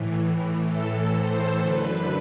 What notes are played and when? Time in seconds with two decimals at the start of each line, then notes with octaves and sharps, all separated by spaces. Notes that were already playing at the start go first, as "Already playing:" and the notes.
Already playing: A2 E3
0.65 A2 E3 A4
1.13 C5
1.61 F#2 D3 B4